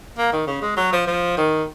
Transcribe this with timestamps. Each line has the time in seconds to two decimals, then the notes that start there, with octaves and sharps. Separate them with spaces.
0.18 A#3
0.32 D#3
0.47 C#3
0.62 G#3
0.77 F#3
0.93 F3
1.07 F3
1.37 D#3